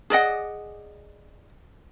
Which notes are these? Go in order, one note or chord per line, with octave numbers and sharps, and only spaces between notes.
G#4 D5 D#5 F#5